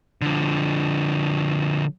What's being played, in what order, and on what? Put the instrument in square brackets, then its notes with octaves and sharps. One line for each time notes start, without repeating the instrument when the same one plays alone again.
[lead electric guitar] D3 F3